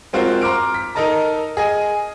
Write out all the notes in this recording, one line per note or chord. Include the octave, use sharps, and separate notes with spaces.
G#3 C4 F4 F#4 A#4 C5
A#5 C6 D6 F6 D7
B6
D#4 A4 A#4 D#5 A5 A#5
G#4 D#5 G#5